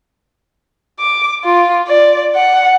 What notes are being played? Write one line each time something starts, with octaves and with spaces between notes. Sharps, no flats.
D6
F4
D5
F#5